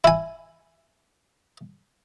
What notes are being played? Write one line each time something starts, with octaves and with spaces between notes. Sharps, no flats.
E4 G#5